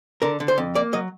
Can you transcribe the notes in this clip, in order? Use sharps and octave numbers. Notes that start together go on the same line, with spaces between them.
D3 A#4
D3
C5
F2
A#3 D5
F#3 D#5